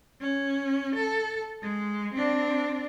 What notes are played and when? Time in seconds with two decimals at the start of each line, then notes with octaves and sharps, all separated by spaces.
0.21 C#4
0.95 A4
1.63 G#3
2.14 C4 D4